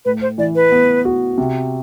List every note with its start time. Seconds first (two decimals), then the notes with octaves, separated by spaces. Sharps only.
0.05 A2 B4
0.22 C5
0.38 E3 D5
0.55 B4
0.72 B3
1.05 F#4
1.38 C3